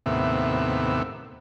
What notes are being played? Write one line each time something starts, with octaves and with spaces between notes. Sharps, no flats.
D#2 A2 C3 B3 E5